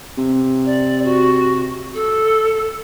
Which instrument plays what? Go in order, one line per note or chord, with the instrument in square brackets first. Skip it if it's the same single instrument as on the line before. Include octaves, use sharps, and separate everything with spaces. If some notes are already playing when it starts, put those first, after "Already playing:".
[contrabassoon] C3
[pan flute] D5
F#4
A4